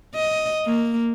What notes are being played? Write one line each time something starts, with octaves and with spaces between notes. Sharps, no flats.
D#5
A#3